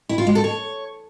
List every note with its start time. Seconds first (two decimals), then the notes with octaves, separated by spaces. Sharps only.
0.09 E4
0.18 F4
0.27 G#3
0.35 A4
0.44 C#5